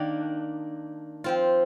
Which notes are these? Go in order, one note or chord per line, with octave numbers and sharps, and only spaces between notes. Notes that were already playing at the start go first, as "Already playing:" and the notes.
Already playing: D#3 A#3 D4
F3 C4 F4